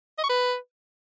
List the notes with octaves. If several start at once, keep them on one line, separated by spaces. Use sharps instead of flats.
D#5
C#6
B4